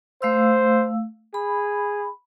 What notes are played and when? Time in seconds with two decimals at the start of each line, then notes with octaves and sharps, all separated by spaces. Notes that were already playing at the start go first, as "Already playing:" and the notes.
0.22 A3 C5 F5 E6
1.34 G#4 B5